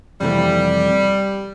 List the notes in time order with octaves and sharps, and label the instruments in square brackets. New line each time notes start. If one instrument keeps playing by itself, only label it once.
[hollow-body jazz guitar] F2 C3 E3 A3 [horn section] G3